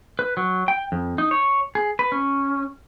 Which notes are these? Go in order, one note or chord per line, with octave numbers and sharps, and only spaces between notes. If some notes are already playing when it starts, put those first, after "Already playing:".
B4
F#3
G5
F2
D#4
C#5
G#4
B4
C#4